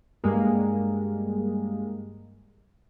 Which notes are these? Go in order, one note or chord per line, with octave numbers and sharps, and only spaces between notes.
G2 G3 G#3 A#3